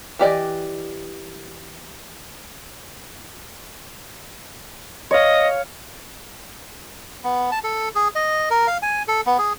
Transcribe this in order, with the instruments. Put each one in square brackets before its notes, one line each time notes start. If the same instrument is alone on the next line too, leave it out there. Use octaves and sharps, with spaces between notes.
[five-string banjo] E3 G4 D5 D#5
[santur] C#5 F5 [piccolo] D#5
[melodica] B3
A5
A4
G#4
D#5
A#4
F5
G#5
A4
B3
G#4